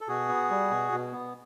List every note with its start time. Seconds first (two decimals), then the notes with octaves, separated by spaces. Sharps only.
0.01 A4
0.08 B2 F#4 G#4
0.29 B3
0.50 G3
0.71 B2
0.92 B2
1.12 B3